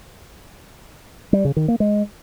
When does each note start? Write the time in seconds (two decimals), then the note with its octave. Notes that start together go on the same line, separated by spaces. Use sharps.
1.33 G3
1.45 C#3
1.57 D#3
1.68 A#3
1.80 G#3